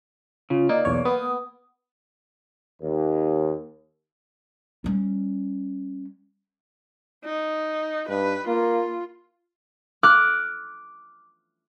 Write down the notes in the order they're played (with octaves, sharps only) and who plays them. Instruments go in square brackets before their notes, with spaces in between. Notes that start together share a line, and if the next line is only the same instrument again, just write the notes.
[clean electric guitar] C#3 [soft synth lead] F4
[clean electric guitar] A#3 [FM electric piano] D#4 [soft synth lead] D5
[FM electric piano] B1 E2 C#5
[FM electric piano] B3 [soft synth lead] D#6
[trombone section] D#2
[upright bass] G3 C#4
[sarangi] D#4
[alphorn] G2 [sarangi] B4
[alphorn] A#3 [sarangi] F4
[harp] D6 F6 F#6